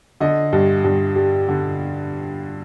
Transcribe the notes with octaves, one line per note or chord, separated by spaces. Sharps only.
D3 D#5
G2
G2
G3
D3